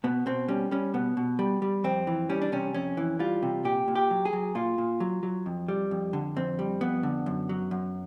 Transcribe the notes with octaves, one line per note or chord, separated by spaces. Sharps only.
B2 B3
B2 C4
G3 C#4
G3 C#4
B2 B3
B2
G3
G3
F2 C4
E3
G3 C#4
D4
C3 C#4
F2 C#4
E3
G3 F4
C3
A#2 G4
A#2
G4
F#3
G#4
F#3
A#2 F4
A#2
F#3
F#3
F2
G3
F2
D3
F2 C4
G3
F2 B3
D3
F#2
F#3
F#2